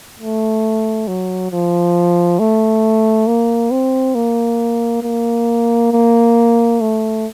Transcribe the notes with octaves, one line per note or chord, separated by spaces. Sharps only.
A3
F#3
F3
A3
A#3
C4
A#3
A#3
A#3
A3